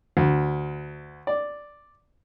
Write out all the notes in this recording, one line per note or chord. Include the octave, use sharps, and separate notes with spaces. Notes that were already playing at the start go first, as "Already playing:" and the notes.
D2
D5